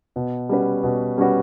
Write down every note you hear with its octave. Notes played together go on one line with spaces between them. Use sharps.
B2
G3 C#4 F#4 B4
B2
G3 C#4 F#4 B4